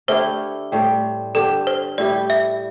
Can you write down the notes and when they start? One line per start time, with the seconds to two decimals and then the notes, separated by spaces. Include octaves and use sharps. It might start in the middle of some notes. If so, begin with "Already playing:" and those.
0.08 D3 A3 E4 G4 C5
0.72 A2 G3 C4 G4
1.35 G2 D3 C4 G4 A4
1.67 C5
1.98 A2 G3 E4 G4 D5
2.30 E5